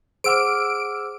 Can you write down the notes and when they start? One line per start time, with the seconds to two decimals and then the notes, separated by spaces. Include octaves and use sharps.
0.24 G#4 C5 F#5 D6 E6 F6 D7